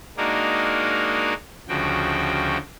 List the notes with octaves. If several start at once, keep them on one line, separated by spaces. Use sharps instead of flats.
G#3 A#3 D4 D#4 F#4 A#4
D2 C#3 F3 F#4 G5